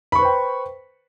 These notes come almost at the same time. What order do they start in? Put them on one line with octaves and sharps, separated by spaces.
B5 C#6 B4 C5 G5